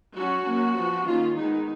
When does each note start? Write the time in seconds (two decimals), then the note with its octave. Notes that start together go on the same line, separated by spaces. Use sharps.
0.14 F#3 C#4 F#4
0.44 F#3 A#3 C#4
0.75 F3 B3
1.05 D#3 A#3 C#4 F4
1.36 D#3 G#3 B3 D#4